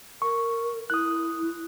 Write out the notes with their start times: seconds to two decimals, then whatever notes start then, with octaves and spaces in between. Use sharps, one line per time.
0.22 A#4 C#6
0.90 E4 D#6 F#6